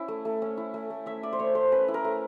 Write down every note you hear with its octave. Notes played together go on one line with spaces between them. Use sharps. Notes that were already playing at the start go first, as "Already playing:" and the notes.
Already playing: C#4 E4
A3
A3
C#4
E4
A3
A3
C#4 E5
E4 D5
C5
A3 C#5
A3 C5
C#4 B4
E4
A#4
A3